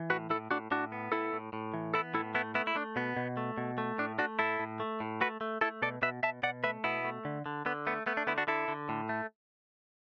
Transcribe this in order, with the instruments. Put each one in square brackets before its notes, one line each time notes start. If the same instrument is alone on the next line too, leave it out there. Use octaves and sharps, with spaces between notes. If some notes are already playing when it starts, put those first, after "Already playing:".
Already playing: [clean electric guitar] E3
A2 F#4 B4
A2 E4 A4
A2 D4 F#4
A2 D4 F#4
B3
A2 E4 A4
A2
A2
E3
B3 E4 A4
A2 E4 A4
A3 B3 E4
A3 B3 E4
E4
A3 D4
B2 B3
B2
A3
B2
A3
A2 D4
A3 D4 F#4
A2 E4 A4
A2
A3
A2
A3 F#4 B4
A3
A3 E4 A4
B2 A4 D5
B2 B4 E5
B2 E5 A5
B2 D5 F#5
A3 B4 E5
B2 B3 E4
A3
D3
D3
D3 B3
A3 B3
A3 B3
D4
D3 B3 E4
D4 F#4
D3 E4 A4
D3
A2
A3